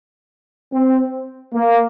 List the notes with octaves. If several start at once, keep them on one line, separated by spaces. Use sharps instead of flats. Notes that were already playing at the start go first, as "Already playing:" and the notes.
C4
A#3